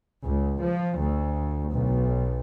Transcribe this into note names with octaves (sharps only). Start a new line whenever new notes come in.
C#2
F3
D2
B1